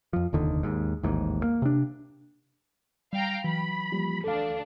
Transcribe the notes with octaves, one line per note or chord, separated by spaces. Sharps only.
F2 F3
F1 D#2 D3 D#3
D#2 G#2
A1 D#2 G#2
A#3
C3 D4
G3 F5 G5 A#5
E3 F#3 B5
F3 G3 A#3
D2 D4 A4 F5